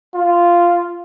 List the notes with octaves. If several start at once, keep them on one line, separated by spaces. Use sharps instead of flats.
F4